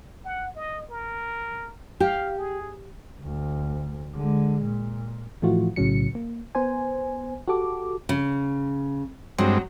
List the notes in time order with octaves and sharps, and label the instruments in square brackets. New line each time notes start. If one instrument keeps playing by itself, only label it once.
[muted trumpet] F#5
D#5
A#4
[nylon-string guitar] G4 [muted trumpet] F5
[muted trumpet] G#4
[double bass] D2
D3 G#3
A#2
[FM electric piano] A2 E3 F3 A3 F4 F#4
B1 A2 C#3 F#3 C#7
A#3
B3 C5 G#5
F#4 G4 A4 D6
[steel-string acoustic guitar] C#3
[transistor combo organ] G2 G#3 C4 [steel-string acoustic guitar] F#3